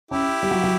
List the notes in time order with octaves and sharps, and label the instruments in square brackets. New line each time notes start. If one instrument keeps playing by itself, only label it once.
[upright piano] C#4 [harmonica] E4 G4
[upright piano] G3
F#3
F#3